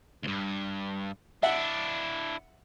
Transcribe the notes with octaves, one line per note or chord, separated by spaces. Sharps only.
D2 G2
D4 E4 E5 F#5